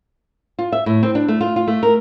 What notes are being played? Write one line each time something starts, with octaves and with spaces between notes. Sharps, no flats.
F4
E5
A2
C4
D4
A3
F4
F4
A3
A#4